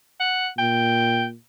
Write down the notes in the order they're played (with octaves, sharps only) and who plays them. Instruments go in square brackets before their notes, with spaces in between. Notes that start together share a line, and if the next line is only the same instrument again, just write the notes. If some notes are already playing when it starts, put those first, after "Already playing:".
[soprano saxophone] F#5
[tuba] A#2 [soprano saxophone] G5